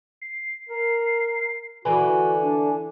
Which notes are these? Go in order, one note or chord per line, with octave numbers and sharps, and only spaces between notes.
C7
A#4
D3 E3 F#4 B4 G#5
D4